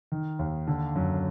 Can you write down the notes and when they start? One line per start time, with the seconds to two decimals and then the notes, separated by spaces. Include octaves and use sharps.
0.12 D#3
0.39 D#2
0.67 D3
0.96 F#2